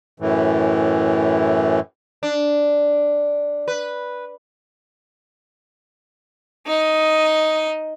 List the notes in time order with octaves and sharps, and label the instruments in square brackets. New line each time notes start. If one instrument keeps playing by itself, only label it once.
[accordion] F#2 A2 E3
[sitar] D4
B4
[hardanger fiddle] D#4 D#5